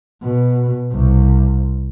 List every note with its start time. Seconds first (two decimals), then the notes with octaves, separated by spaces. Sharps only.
0.21 B2
0.91 C2